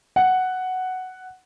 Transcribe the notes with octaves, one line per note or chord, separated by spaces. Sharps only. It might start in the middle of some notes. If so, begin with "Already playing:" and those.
F#5